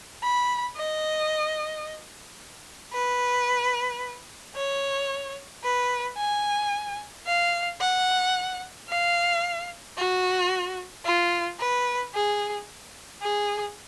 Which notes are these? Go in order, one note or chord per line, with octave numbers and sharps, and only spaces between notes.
B5
D#5
B4
C#5
B4
G#5
F5
F#5
F5
F#4
F4
B4
G#4
G#4